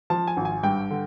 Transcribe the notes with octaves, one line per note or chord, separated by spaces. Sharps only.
F3 A5
G#5
G#1
G#5
G2 G5
D3